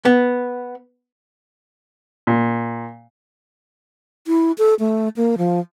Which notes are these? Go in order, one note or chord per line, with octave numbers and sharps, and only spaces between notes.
B3
A#2
E4
A4
A3
A#3
F3